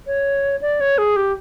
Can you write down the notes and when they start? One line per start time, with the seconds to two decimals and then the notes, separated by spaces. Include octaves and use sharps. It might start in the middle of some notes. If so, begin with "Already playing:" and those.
0.07 C#5
0.61 D5
0.80 C#5
0.98 G#4
1.16 G4